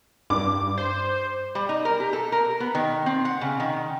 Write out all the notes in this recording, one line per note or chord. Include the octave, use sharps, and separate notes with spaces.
G2 D6
C5
G3
D#4
A#4
G4
A4
A#4
B3
D#3
C4
F#5
C#3
D#3